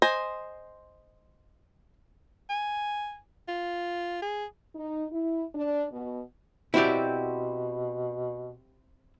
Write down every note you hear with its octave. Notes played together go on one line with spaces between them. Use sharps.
C5 D#5 G#5
G#5
F4
G#4
D#4
E4
D4
B2
B2 C4 E4 F#4 G4 D5